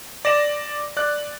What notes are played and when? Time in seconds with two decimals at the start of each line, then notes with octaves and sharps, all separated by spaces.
0.25 D5 A#6 E7
0.97 D5 F#6